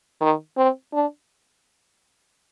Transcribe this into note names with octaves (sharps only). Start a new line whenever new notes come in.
D#3
C4
D4